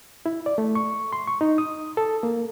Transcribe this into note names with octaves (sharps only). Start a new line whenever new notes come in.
E4
D5
A3
C#6
C6
C#6
D#4
D#6
A4
A#3